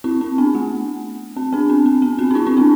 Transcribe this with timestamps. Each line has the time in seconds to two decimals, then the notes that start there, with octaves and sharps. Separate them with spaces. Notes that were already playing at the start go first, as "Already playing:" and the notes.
0.04 C4 E4
0.21 C4
0.38 B3 D4
0.55 A3
1.37 C4
1.53 B3 D4
1.70 C4
1.86 C4
2.02 B3
2.19 C4
2.31 D4
2.35 C4 E4
2.47 C4 E4
2.57 B3 D4